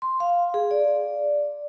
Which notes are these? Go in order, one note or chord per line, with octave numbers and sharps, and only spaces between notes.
C6
F5
G#4
D5